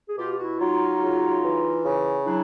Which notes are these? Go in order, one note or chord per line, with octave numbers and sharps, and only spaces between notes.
G#4
B2 F4 G4
G4
E4 F#4
F#3 D#4 F4
C#3
E3
C#3
F#3 D4 E4